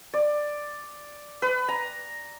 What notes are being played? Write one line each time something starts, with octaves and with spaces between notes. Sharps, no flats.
D5
B4
A#5